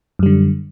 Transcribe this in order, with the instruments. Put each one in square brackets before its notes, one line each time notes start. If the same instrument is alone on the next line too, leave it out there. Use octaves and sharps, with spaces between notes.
[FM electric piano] F#2
G3
D3